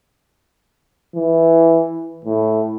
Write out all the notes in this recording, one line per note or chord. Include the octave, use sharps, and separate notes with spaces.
E3
A2